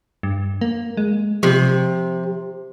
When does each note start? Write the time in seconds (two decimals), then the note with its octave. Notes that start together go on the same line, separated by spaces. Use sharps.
0.23 G2
0.61 A#3
0.97 G#3
1.43 C3 F3